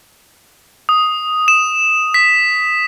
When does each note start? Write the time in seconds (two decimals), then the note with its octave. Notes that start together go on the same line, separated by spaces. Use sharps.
0.89 D#6
1.48 E7
2.14 B6